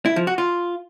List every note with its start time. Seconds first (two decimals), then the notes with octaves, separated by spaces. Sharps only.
0.06 E4
0.16 F3
0.27 F#4
0.38 F4